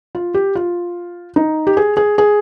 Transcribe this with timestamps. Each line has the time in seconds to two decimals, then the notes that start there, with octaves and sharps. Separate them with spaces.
0.15 F4
0.34 G4
0.55 F4
1.36 D#4
1.67 G4
1.77 G#4
1.97 G#4
2.18 G#4